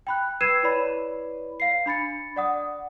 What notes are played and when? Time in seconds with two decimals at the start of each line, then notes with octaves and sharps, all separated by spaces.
0.07 G5 B5 F#6
0.41 B4 E6 G#6 C7 D#7 E7
0.63 E4 B4 C#5 D5 B5
1.60 F5 C7
1.86 D4 B5 A6 C#7
2.36 D5 F#5 D#6